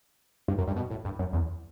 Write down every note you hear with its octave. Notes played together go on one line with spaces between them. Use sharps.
G2
F#2
G2
B2
A2
G2
F#2
E2